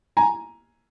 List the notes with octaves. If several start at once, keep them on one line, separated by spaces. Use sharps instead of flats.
G#5 A#5